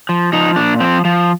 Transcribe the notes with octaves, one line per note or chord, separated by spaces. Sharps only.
F3
F3 D#4
A#2 D4
F3 C4
F3